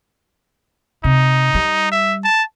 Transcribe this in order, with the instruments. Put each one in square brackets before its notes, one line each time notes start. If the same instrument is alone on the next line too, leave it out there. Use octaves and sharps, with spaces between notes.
[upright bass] C3 [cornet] D#4
[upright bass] G3
[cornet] E5
A5